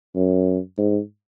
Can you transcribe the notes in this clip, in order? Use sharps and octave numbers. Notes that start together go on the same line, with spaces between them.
F#2
G#2